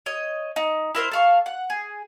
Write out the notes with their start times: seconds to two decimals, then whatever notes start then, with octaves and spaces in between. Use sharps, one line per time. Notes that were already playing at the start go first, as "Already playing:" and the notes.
0.06 C#5 D#5
0.56 D#4
0.95 E4 A#4 C5 C6
1.11 A4 F5 C#6
1.46 F#5
1.70 G#4